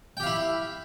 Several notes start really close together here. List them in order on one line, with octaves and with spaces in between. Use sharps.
G5 G4 F5 E4